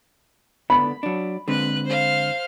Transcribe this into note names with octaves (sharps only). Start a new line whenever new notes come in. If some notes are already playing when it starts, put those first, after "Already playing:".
D3 B3 D4 B5
F#3 D4
D3 G#3 C4 B4 F#6
C5 F5